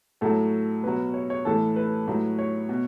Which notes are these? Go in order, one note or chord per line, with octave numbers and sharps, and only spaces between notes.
A2 F#3 A4
B2 F#3 B4
C#5
C#5
A2 E3 A4
B4
A2 F#3
C#5
B2